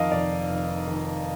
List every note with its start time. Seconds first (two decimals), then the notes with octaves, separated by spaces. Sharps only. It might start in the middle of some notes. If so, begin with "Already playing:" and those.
Already playing: F2 D#3 A#4 D#5 F5
0.12 F1 D5
0.49 F1
0.87 D#3